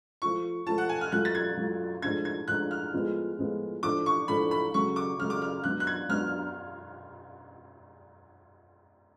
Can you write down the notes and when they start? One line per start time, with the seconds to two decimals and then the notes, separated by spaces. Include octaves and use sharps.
0.22 F3 A3 F4 C#6
0.67 F3 A3 F4 A5
0.78 F#5
0.89 G#5
1.01 F6
1.12 F#3 A3 F4 F#6
1.25 A6
1.35 G#6
1.57 F#3 A3 F4
2.02 A2 F3 G#3 D4 G#6
2.25 G#6
2.48 A2 F3 G#3 D4 F#6
2.71 F6
2.94 A2 F3 G#3 B3 F4
3.38 A2 F3 G#3 B3 F4
3.83 A2 F3 A3 D4 D6
4.06 C#6
4.28 A2 F3 A3 D4 B5
4.51 B5
4.74 C#3 F#3 A3 C#4 C#6
4.96 D6
5.19 C#3 F#3 A3 C#4 F6
5.30 D6
5.42 F6
5.64 F#3 B3 D4 F#6
5.80 F#6
5.87 G#6
6.09 F#3 B3 D4 F6